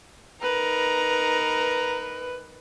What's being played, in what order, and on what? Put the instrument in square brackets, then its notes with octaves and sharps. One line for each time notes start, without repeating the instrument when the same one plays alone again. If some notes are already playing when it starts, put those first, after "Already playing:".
[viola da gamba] D#4 A#4 [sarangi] B4 [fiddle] A#5